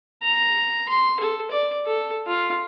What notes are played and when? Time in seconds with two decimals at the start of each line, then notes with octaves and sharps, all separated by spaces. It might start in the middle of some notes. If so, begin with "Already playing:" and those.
0.23 A#5
0.89 C6
1.20 A4
1.51 D5
1.86 A4
2.27 F4